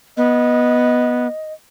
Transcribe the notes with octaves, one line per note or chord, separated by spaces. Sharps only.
B3 D#5